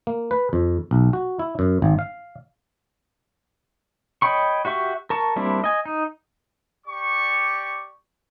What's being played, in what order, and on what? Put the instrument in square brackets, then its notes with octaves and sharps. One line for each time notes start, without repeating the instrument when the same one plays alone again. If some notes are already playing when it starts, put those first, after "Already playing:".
[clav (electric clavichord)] A#3
B4
F2
B1
F#4
E4
F#2
G#1
F5
[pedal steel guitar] C#5 D#5 G5 B5 C#6
F#4 G4 E5 C#6
A#4 A5 C#6
G3 A#3 C4 D4 E4
D#5 G#5
D#4
[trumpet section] G4 D5 C#6